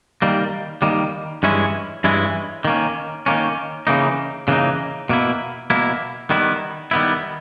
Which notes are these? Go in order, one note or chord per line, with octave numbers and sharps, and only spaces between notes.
D#3 G3 A#3
D#3 G3 A#3
G2 E3 G#3 C#4 E4
G2 E3 G#3 C#4 E4
D#3 A#3 C#4
D#3 A#3 C#4
C#3 E3 A#3 D#4
C#3 E3 A#3 D#4
B2 A#3 E4
B2 A#3 E4
D#3 G3 B3 E4
D#3 G3 B3 E4